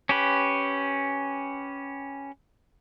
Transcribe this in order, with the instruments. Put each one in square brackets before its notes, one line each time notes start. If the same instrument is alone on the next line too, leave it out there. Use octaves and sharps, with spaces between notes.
[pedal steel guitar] C#4 G4 B4